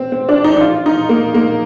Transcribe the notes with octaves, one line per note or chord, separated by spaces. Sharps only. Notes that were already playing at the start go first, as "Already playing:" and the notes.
Already playing: C4
C4
D4
D#4
D#4
F4
D#4
A#3
A#3